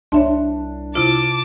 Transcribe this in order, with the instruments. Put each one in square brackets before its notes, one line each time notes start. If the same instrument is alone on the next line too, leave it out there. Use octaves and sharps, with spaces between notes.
[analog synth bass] C2 [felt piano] D4 [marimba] C#5 E5 C6
[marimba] C3 E4 F4 [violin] A5 D6